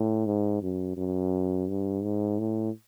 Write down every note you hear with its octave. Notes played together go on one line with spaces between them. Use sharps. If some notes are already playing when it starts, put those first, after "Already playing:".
Already playing: A2
G#2
F#2
F#2
G2
G#2
A2